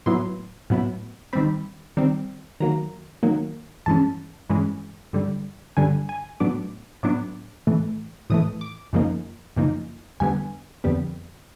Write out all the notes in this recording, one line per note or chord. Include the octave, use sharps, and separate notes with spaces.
A2 F#3 B3 E4 C6
A2 F#3 B3 E4
D#3 G3 C4 B5
D#3 G3 C4
D#3 F#3 A#3 A#5
D#3 F#3 A#3
G2 E3 G#3 C#4 A5
G2 E3 G#3 C#4
G2 D3 G3
G2 D3 G3 G#5
G#5
A2 F#3 B3 D4 D6
A2 F#3 B3 D4 D6
A2 E3 A3
A2 E3 A3 D#6
D6
F#2 C#3 F3 A#3 D#4
F#2 C#3 F3 A#3 D#4
F2 D3 G3 B3 G#5
F2 D3 G3 B3